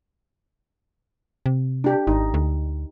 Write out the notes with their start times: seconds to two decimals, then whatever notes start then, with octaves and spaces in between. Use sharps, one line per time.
1.46 C3
1.84 D4 G4
2.07 G#1 D#4
2.34 D2